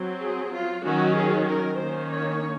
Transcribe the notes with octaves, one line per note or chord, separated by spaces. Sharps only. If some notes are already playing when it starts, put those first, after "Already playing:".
Already playing: F#3 C4
G#4
F4
D#3 F#3 C#4 F#4
G#4
A#4
D#3 A#3 C#4 C5
C#5